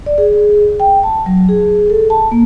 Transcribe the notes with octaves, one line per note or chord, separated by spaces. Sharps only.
D5
G#4
G5
A5
F#3
G#4
A4
A5
A#3